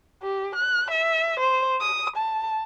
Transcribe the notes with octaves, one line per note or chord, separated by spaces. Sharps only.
G4
F#6
E5
C5
D#6
A5